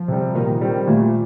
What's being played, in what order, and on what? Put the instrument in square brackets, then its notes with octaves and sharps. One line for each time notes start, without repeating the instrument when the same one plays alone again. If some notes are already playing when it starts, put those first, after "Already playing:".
Already playing: [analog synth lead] F3
[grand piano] C3 G3
[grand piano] A#2 [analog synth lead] D#3
[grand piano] G3 C4
[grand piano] A#2 [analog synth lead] A3